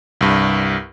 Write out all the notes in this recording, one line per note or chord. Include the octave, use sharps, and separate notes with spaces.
C2 G2